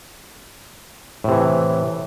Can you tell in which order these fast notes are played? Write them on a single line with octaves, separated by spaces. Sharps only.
A2 C3 E3